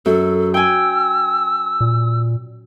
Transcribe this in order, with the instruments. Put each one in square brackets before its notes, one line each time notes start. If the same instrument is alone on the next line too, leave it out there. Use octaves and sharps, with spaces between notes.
[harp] F#2 [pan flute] A4
[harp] G5 G#5 [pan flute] E6
[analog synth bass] A#2